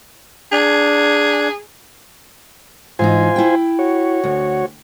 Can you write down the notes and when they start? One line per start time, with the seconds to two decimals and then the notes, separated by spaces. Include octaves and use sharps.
0.52 D4 G#4
2.99 G#2 E3 D#4 F4 C5 G#5
3.36 E4 G5
3.79 F#4 C#5
4.24 D2